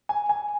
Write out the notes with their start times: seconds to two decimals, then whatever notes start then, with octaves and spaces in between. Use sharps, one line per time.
0.09 G#5
0.29 G#5